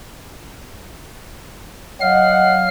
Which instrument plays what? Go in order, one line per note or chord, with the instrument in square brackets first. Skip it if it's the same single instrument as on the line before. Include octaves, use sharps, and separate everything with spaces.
[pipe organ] F#3 F5 F6 [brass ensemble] D#5 F#5